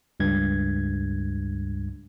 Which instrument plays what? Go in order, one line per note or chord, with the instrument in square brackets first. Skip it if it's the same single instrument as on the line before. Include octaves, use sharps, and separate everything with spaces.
[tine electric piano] C#2 G2 G#6